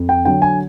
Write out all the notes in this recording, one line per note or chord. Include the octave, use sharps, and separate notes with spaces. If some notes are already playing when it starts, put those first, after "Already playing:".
Already playing: F2
G5
D3 F#3 G5
G#5